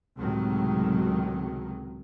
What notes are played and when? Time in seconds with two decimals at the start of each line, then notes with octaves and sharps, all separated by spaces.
0.18 C#2 A2 C3 D#3 F#3